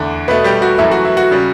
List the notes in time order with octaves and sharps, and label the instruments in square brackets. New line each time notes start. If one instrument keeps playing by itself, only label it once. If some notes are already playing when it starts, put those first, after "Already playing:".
Already playing: [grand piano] E2 D3 A3
B2 A3 B3 B4
G3 G4
F#4
F#2 E3 A3 E4
F#4
E4
F#4
C#3 G3